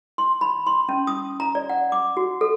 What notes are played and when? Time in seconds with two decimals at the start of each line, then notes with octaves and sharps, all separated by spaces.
0.18 C6
0.41 B5
0.67 C6
0.89 C#4
1.07 D#6
1.40 A#5
1.55 D5
1.69 F#5
1.92 D6
2.17 F#4
2.41 A4